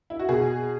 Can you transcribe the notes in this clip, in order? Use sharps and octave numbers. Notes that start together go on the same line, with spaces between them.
E4
F#4
B2 G#4